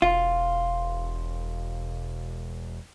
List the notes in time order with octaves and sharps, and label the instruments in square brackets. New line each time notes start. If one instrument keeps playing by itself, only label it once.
[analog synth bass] E1 [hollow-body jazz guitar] F4